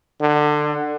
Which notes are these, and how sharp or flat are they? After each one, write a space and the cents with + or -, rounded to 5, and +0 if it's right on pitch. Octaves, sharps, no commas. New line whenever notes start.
D3 +20